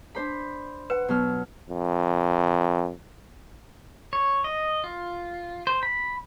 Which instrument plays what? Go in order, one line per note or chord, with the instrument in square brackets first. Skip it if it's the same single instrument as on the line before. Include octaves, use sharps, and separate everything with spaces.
[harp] D4 C5 B5
[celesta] B4 [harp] F#5
[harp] B2 F#3 F6
[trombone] F2
[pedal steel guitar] C#5
D#5
F4
C5
B5